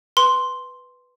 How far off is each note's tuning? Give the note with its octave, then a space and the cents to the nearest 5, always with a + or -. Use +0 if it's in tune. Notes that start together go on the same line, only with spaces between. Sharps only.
B4 +0 C6 +0